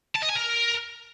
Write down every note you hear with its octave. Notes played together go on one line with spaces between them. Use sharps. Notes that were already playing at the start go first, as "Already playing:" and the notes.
A5
D#5
G#5
A#4